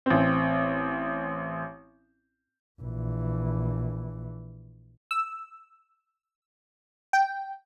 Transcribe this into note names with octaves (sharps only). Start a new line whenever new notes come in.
A1 C4
A#1 E3
E6
G5